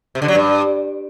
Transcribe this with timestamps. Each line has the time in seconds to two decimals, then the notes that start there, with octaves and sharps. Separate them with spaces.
0.15 C3
0.22 D3
0.28 F#3
0.35 G2